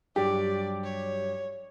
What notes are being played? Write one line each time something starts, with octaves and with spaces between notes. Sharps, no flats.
G2 F#3 G4 D5
C#5